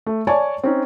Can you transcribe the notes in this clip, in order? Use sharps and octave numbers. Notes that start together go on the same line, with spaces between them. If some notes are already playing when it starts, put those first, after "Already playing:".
A3
C#5 D5 G#5 A5 C#6
C4 C#4 D#4